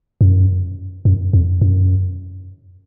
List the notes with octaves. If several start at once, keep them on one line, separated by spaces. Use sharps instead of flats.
F#2
F#2
F2
F#2